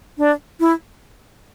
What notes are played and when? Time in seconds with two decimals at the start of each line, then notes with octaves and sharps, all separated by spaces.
0.18 D4
0.60 E4